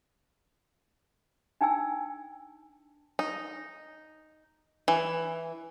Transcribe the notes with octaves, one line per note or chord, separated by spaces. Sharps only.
D4 D#4 G5 G#5 E6
D#4
E3